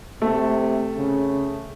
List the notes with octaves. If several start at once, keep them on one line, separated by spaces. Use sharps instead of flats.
C3 A3
C#3